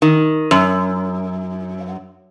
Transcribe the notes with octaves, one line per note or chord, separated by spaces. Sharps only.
D#3
F#2